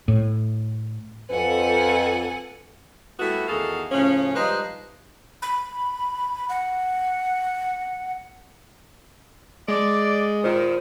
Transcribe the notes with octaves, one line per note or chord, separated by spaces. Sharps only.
A2
F2 A4 B4 F#5 G#5
G3 A3 B3 E4 F#4
E2 D#3 F#4 G#4 A4 F5
A2 C#3 F3 C#4
F3 G3 G#3 D#4 B4 C5
B5
F#5
G#3 D5
A#2 D#3 F4 C5